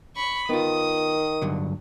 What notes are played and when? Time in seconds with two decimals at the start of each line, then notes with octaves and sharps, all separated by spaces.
0.16 B5 C#6
0.50 D#3 B3 F4 D#6
1.42 G2 D3 F#3